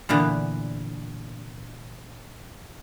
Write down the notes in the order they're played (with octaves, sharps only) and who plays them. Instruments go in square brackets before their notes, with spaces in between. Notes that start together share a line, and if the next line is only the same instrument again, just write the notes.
[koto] A#2 D3 E3 B3